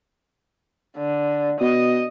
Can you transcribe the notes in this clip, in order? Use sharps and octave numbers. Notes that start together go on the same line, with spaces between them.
D3
B2 D#5